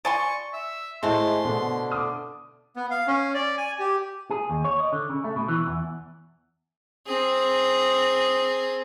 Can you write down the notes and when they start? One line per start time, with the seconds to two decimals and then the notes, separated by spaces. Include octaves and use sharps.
0.05 D5 G#5 C6 C#6
0.53 E5
1.03 A2 G#3 A3 C4 C6
1.45 B2 D3
1.91 D6 D#6
2.76 B3
2.91 F5
3.07 C#4
3.34 D5
3.58 G#5
3.79 G4
4.31 G#4
4.50 D#2
4.64 C#5
4.80 D#5
4.92 D3
5.10 C#3
5.24 A3
5.36 B2
5.48 E3
5.67 E2
7.07 C4 G#4